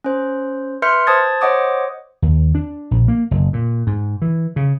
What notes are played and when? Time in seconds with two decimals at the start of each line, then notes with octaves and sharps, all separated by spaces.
0.04 C#4 C5
0.82 B4 E5 C6 F6 G6 C#7
1.07 C5 A5 D#6 G#6 A6
1.41 C5 C#5 D#5 F#5 D6 D#6
2.22 D#2
2.55 D4
2.91 A#1
3.08 A#3
3.31 F#1
3.53 A#2
3.87 G#2
4.22 E3
4.56 C#3